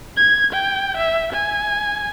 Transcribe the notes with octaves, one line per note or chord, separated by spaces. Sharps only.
G#6
G5
E5
G#5